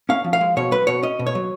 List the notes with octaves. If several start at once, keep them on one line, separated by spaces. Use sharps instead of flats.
C#4 F5
F3
F5
G#3
B2 C#5
F#3 B4
B2 C#5
C#4 D#5
B2
C#5
F#3